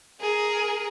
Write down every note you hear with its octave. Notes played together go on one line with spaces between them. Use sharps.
G#4 A#4